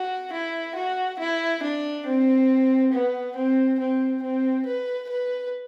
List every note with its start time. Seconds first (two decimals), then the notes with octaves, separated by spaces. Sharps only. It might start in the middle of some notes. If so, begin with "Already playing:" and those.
Already playing: F#4
0.33 E4
0.76 F#4
1.19 E4
1.63 D4
2.06 C4
2.93 B3
3.36 C4
3.80 C4
4.23 C4
4.66 B4
5.10 B4